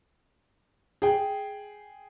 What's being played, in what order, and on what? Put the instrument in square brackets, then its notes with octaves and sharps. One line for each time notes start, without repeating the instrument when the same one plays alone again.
[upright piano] G#4 G5